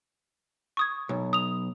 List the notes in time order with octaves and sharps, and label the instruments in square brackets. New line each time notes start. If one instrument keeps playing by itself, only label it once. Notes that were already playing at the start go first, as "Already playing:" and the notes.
[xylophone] C#6 D#6 G#6
[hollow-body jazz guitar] B1
[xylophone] D#6 F7